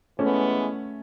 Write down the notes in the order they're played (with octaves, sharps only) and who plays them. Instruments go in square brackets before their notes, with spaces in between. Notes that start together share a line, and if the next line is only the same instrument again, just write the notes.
[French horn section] E3 G#3 B3 [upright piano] A3 C#4